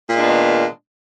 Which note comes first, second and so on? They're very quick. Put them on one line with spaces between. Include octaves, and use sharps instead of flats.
A#2 G#3 D4 B3 D#3